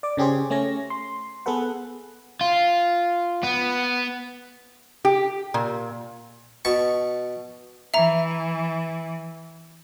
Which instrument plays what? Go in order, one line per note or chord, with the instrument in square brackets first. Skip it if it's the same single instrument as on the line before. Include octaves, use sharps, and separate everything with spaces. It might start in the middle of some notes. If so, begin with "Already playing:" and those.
[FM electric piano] D5 D6
C#3 C#4 G4 G#4 C5
A3 C#4 C#5 A#6
C6
B3 G#4 A4 B4 F#5
[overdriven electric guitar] F4
B3
[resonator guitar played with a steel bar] G4
A#2
[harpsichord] B2 A5 C#6
[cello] E3 [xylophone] E5 A#5